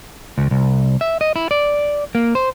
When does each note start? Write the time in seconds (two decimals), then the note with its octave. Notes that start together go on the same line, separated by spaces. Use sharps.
0.38 C#2
0.51 C2
1.01 E5
1.21 D#5
1.36 E4
1.51 D5
2.15 A#3
2.35 C5